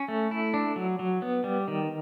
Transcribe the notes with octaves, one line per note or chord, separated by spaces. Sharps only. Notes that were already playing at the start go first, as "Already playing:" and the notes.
Already playing: C#4
A3
E4
D4
F#3
F#3
B3
G3
D#3